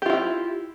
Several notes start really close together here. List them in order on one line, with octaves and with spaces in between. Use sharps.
G4 F4 E4